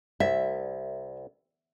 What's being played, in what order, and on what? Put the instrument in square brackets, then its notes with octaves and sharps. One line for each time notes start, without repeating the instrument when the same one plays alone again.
[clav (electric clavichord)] C2 [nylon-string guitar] E5